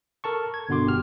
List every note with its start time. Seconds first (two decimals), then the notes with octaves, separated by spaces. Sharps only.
0.24 A4 A#4 A5 C#6
0.54 G#6
0.69 G1 B2 D3 F#4 C6 D6
0.86 G1 G4 F6